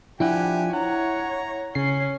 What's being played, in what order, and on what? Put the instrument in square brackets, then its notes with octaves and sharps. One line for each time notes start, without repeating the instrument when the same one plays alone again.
[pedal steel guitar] F3 D4 F#5 [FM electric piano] E4 [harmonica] G4 G#5
[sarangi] C#5 [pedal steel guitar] F#5 [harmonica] A#5
[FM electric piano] C#3 C7 [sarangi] C#4